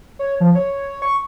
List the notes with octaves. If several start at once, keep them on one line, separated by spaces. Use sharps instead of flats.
C#5
F3
C#5
C#6